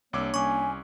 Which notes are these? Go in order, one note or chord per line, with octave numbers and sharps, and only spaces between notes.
C2 A#3 D4 C#5 D6 E6
C2 C#4 G#5 C#6 D6